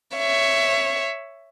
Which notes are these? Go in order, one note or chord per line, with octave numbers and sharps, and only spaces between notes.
C#5 E5